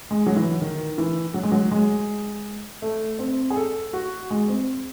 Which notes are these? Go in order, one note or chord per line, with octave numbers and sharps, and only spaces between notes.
G#3
F#3
E3
D#3
E3
F#3
G#3
F#3
G#3
A3
C4
G#4
A4
F#4
G#3
C4